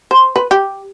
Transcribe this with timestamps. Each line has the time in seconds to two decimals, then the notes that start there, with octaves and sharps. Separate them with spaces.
0.11 C5
0.36 B4
0.51 G4